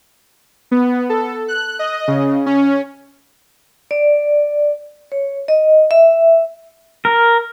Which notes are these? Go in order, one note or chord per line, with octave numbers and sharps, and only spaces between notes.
B3
A4
F#6
D#5
C#3
C#4
D5
C#5
D#5
E5
A#4